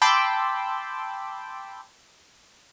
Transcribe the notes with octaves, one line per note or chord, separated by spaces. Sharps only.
G5 A5 B5 C6 D6 E6